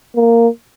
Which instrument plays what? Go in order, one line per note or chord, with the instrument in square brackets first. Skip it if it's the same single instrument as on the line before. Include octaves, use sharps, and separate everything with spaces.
[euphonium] A#3